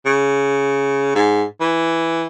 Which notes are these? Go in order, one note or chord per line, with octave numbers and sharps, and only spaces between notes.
C#3
G#2
E3